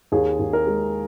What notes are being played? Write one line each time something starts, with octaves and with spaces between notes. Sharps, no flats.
D#2 G#4
D#2
A#4
G#3